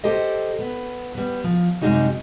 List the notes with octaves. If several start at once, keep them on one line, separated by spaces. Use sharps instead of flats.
G4 A4 C5 D#5
B3
G3 B3
F3
F#2 C3 G3 G#3 D#4 F#4